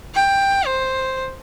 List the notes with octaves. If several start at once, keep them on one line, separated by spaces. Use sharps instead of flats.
G5
C5